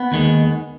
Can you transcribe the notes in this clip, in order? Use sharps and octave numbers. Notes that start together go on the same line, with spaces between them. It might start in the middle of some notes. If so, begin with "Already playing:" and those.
Already playing: B3
D#2 D#3 G#3